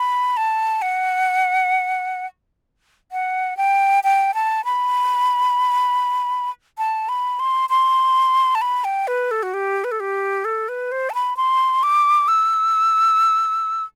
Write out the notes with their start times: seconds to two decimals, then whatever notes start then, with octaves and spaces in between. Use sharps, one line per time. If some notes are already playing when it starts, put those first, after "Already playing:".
Already playing: B5
0.37 A5
0.82 F#5
3.12 F#5
3.57 G5
4.04 G5
4.34 A5
4.65 B5
6.78 A5
7.09 B5
7.39 C6
7.69 C6
8.55 A5
8.61 B5
8.84 G5
9.07 B4
9.31 A4
9.43 F#4
9.54 G4
9.84 B4
9.91 A4
10.00 G4
10.45 A4
10.68 B4
10.92 C5
11.10 A5
11.14 B5
11.37 C6
11.83 D6
12.28 E6